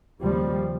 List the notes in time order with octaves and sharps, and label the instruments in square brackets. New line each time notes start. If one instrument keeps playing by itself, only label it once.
[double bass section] D#2 C#3 F3 G3